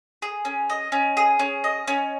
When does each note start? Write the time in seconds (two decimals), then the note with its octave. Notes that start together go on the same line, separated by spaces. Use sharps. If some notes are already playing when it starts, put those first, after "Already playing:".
0.22 G#4
0.45 C#4
0.70 D#5
0.92 C#4
1.17 G#4
1.39 C#4
1.64 D#5
1.88 C#4